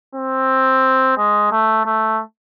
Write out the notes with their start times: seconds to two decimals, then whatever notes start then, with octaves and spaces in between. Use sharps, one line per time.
0.15 C4
1.17 G#3
1.51 A3
1.85 A3